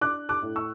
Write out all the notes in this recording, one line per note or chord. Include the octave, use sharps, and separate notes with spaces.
D4 D6 F#6
D6 F#6
A2
C#6 E6